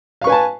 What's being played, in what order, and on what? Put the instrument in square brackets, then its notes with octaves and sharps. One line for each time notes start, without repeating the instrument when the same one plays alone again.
[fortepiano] F5
C#6
B4
G#5
A5